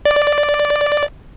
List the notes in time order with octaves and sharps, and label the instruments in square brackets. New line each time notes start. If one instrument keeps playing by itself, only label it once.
[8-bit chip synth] D5